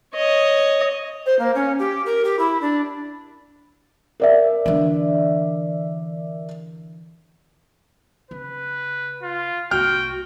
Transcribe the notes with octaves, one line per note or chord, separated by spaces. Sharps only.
C#5 D#5
C5
A#3
C#4
G4
A#4
G4
E4
D4
A#4 D5 E5
D3 E3
C#3 B4
F4
C2 A#3 F#4 G5 F6